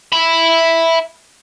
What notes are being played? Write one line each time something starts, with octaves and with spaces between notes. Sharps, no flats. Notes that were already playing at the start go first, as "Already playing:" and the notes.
E5 B5